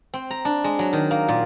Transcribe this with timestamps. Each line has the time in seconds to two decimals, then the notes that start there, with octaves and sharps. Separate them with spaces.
0.14 C4
0.31 A#5
0.45 D4
0.64 G#3
0.79 F#3
0.93 D#3
1.11 A#3
1.28 A#2